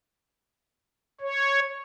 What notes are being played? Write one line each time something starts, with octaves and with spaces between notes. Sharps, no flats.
C#5